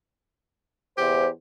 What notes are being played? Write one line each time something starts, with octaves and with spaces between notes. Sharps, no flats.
E2 G4 C5